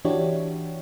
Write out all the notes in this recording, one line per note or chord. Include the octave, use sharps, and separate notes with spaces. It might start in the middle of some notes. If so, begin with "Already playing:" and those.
E3 D4 E4 F#4 G4 C#5